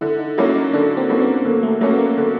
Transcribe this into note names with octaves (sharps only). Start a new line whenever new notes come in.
D3 E4
D#4
F#3 A#3 C#4 E4
D#4
D3 D4
C4
F#3 A#3 C#4
B3
D3 A#3
A3
F#3 A3 A#3 C#4
B3
A#3
D3